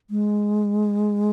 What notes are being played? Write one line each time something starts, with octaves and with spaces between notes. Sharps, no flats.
G#3